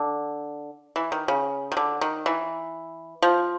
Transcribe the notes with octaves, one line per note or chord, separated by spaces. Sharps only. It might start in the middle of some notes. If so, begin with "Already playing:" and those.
Already playing: D3
E3
D#3
C#3
D#3
D3
D#3
E3
F3